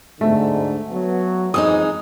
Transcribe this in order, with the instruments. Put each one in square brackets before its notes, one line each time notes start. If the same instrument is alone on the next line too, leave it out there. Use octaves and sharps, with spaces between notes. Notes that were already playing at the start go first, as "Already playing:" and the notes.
[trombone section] D2 G#2 D3 [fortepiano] A3
[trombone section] F#3 B3
[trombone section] F2 [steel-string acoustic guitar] E3 G#3 D#4 [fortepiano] D#6